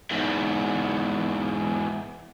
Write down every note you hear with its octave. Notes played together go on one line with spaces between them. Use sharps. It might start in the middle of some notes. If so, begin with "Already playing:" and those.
E2 G#2